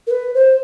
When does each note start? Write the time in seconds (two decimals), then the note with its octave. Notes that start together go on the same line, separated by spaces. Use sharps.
0.07 A#4
0.11 B4
0.35 C5